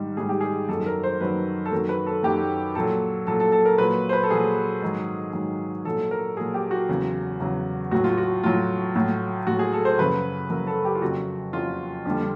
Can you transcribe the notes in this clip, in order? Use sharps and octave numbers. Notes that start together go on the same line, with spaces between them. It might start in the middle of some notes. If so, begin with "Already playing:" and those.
Already playing: G#2 D#3 G3
G#2 D#3 G3 G#4
G4
G#4
F#2 D#3 F#3 A4
A4
A#4
C5
F#2 D#3 F#3 B4
A4
F#2 D#3 F#3 A#4
B4
A4
F#2 D#3 F#3 G4
A#2 F#3 A4
A#2 F#3 A4
A4
A4
A#4
A#2 F#3 B4
C5
B4
A4
A#2 F#3 G#4
G#2 D#3 F#3
G#2 D#3 F#3
A#2 F#3 A4
A#4
A#2 F#3 G#4
G4
F#4
E2 C#3 F#3
E2 C#3 F#3
A2 F#3 F#4
F4
F#4
A2 F#3 F4
A2 F#3
A2 F#3 F#4
G#4
A4
C5
F#2 C#3 F#3 B4
F#2 C#3 F#3 A#4
A4
G4
F4
F2 C#3 F#3 F#4
F2 C#3 F#3 F4
F2 D3 G3